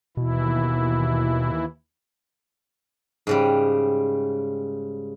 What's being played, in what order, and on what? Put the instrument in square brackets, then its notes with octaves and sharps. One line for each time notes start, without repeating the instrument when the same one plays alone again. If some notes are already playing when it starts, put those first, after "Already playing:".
[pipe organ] D#2 E3 E4 [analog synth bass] B2
[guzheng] G#2 C#3 G3